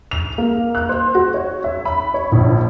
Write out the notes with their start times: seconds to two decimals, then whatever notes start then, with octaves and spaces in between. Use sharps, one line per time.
0.11 F7
0.38 A#3
0.75 F#6
0.89 C5
1.15 F#4
1.34 C#5
1.64 E5
1.85 B5
2.14 C#5
2.32 A#1